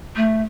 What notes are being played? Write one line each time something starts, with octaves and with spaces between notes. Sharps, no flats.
A3